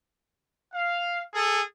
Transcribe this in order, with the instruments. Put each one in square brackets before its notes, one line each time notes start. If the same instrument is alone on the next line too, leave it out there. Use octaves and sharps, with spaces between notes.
[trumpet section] F5
G#4 A4